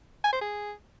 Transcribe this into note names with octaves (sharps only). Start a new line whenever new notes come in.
G#5
C5
G#4